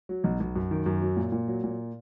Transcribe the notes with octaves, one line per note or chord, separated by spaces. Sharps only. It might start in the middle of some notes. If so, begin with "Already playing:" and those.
F#3
B1
B1
F#2
D#3
F#2
F#3
A#2
A#2
F#3
A#2